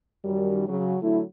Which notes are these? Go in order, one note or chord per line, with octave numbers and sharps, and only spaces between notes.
F#2 D#3 G3
C#3 F#3
D3 F#3 A3 E4